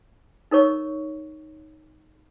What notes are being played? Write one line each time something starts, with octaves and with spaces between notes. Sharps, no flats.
D#4 A#4 C#5 C#6